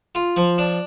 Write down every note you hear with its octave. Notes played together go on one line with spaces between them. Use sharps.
F4
F3
D4